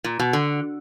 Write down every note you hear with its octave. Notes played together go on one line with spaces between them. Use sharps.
A#2
B2
D3